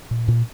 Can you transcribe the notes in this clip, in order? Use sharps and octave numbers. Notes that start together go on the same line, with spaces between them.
A#2
A#2